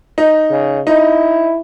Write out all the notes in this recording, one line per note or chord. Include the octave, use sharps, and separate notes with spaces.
D#4
C#3
D#4 E4